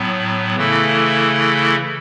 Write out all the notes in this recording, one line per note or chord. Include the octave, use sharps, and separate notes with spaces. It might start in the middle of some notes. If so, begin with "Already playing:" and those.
Already playing: A2 F#3 B3
C#3 E3 A3 E4 A4